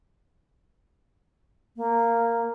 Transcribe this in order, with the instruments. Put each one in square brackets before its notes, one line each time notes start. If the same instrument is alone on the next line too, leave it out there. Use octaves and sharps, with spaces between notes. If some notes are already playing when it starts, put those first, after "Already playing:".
[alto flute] A#3